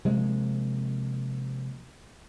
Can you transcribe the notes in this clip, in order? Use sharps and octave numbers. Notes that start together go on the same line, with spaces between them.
C3 F3 G#3 A#3